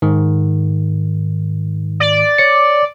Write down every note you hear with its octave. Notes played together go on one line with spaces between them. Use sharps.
G#2 D#3
D5
C#5 C#7